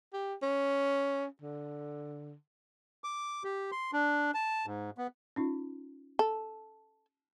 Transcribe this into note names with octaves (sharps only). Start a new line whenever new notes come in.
G4
C#4
D3
D6
G4
C6
D4
A5
G#2
B3
C#4 D#4 F4
A4